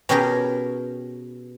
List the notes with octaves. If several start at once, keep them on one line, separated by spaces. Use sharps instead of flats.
B2 C#4 G4 G#4 A#4 B4